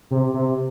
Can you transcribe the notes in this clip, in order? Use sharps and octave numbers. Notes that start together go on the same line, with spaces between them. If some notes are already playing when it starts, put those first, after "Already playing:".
C3
C3